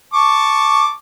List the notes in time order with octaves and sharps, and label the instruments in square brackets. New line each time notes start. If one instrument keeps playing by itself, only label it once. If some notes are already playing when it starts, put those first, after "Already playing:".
[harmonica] A5 C#6 D6